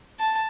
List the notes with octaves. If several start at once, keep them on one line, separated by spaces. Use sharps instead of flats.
A5